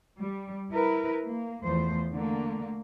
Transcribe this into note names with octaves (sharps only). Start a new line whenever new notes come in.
G3
E4 A#4 B4
A#3
E2 F3 A3 C5
D3 A3 A#3